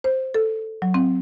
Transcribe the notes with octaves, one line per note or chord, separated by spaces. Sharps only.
C5
A4
F#3
C4